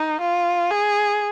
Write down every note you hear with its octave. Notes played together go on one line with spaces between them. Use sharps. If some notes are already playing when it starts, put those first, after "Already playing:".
Already playing: D#4
F4
G#4